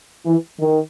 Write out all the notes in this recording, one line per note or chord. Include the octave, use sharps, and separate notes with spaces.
E3
D#3